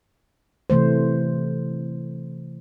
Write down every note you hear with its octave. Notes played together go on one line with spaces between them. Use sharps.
C3 E3 A3 C5